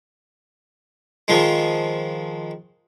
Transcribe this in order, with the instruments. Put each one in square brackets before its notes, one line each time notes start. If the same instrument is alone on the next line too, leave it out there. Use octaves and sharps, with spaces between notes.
[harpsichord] D#3 F3 G#3